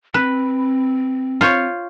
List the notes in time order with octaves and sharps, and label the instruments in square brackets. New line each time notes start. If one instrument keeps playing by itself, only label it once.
[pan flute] C4 [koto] B4
[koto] F4 C5 C#5